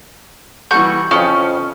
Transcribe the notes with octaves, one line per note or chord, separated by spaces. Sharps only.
E3 G3 F#4 C#6 G6
F2 C#3 F3 C#4